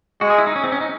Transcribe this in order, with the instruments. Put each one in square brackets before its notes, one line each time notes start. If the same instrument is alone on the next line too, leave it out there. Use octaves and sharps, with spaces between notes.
[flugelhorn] G#3 [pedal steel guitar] F#4
[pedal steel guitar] G#4
E4
D#4
C#4
C4
C#4
D#4